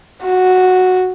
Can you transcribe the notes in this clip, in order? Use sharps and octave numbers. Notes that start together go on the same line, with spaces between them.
F#4